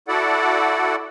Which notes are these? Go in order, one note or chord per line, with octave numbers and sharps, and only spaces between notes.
E4 F#4 A4 D5 F#5